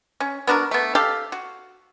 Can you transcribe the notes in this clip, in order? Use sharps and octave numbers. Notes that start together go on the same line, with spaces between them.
C#4
B3 D4 F#4 A#4
A3 B3
G4 A4 F5
F#4